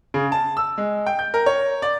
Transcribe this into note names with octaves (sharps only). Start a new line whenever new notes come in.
C#3
A5
E6
G#3
G5
G6
A#4
C#5
D5